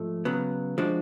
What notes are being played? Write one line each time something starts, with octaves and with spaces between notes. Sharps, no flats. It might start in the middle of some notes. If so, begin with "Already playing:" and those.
Already playing: G#2 F3 A3
C#3 F#3 B3
F3 G#3 D4 F#4